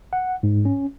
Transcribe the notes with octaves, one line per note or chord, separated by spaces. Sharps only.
F#5
G#2
C#4